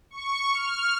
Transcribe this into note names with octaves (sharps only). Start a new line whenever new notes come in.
C#6
F6